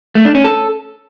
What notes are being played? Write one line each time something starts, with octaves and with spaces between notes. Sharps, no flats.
A3
D4
C#4
A4